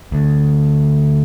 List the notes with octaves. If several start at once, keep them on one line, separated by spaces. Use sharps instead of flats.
D2